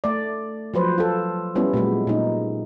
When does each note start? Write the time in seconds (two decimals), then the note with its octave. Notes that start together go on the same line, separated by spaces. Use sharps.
0.04 A3 D5
0.74 F3 F#3 B4 C5
0.98 F4 A4
1.55 G3 B3 C#4 E4
1.73 A#2 F#3 G#3
2.07 A#2 D#4